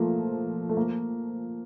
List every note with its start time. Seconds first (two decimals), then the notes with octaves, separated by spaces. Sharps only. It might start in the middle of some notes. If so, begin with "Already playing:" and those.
Already playing: F3 A3 A#3
0.69 A3
0.77 A#3